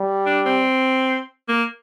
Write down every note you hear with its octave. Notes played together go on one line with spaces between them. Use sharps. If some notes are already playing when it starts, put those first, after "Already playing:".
Already playing: G3
D4
C4
A#3